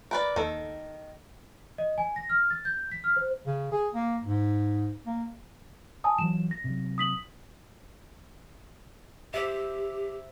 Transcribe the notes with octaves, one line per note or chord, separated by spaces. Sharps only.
A#4 B4 D5
D#2 D#3 A4
D#5
G#5
A#6
F6
A6
G6
B6
F6
C5
C#3
G#4
A#3
G#2
A#3
G#5 A5 D#6
E3 F#3 E7
A#6
C3 F#3
D#6 B6 F#7
G4 C5 E5